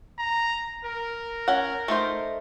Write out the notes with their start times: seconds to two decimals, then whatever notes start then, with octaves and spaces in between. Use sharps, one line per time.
0.18 A#5
0.84 A#4
1.48 C#4 F#5
1.88 A3 D#4 C5